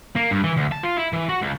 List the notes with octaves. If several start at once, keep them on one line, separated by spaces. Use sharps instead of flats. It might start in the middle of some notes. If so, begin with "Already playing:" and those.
A#3
G2
E3
D2
A5
F4
E4
E3
F#4
C#2